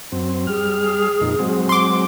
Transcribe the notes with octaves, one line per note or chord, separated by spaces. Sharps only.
F#2 C4
G3 G#4 F6
F2 A#2 D#4
F#3 G#3 C4
C6 D6